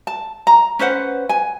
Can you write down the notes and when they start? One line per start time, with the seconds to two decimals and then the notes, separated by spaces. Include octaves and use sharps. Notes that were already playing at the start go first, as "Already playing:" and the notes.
0.07 A5
0.47 A#5
0.79 C#4 B4 C5 F#5
1.29 G#5